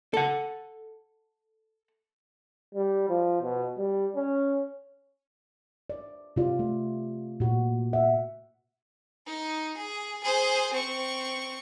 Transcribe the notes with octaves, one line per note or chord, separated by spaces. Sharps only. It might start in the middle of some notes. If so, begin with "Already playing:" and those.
A4 F#5
G3
F3
B2
G3
C#4
D5
C3 F4 D5
A3
A#2 F#4
E5 F#5
D#4
G#4
G#4 C5
C4 C#6